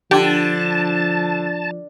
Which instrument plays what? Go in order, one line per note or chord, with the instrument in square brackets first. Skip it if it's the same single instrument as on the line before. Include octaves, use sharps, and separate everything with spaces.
[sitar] D3 [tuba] F3 [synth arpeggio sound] G4 [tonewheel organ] A5